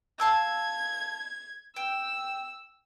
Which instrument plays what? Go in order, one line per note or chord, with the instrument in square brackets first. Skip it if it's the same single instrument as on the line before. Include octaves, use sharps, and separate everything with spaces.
[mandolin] F5 A5 E6 [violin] G#6
[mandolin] G5 [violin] E6